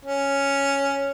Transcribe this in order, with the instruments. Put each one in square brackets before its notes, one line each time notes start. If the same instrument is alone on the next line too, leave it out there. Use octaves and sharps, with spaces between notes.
[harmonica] C#4